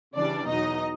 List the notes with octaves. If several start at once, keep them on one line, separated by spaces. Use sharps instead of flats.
C#3 E3 G3 D4 D5
E2 B2 F#3 D#4 D#5